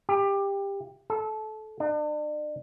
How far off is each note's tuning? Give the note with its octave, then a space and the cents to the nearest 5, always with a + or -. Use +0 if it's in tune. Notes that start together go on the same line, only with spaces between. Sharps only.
G4 +20
A4 -20
D4 +40